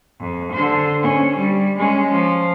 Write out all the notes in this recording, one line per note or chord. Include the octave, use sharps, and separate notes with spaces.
F2
D3 C5
C#4
G3
G#3 C#4
F3